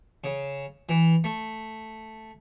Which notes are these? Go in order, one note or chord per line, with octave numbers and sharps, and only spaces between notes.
C#3
E3
A3